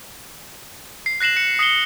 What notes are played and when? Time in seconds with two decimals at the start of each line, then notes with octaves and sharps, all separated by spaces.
1.06 C7
1.20 F#6 A#6 C7 E7 F#7
1.37 C#7
1.59 D#6 C7 C#7 G7